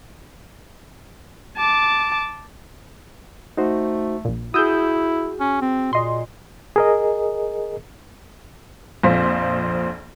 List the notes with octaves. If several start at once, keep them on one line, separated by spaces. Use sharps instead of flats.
A5 D6
A3 D#4 F#4 C5
A#1 A#2
E4 F#4 G#4 D#6 E6 G6
C#4
C4
A#2 D#5 C6
G#4 A#4 D#5
A#1 F2 F4 C5 B6